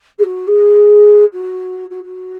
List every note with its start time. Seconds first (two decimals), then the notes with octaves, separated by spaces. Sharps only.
0.18 G#4
0.23 F#4
0.47 G#4
1.33 F#4
1.90 F#4
2.04 F#4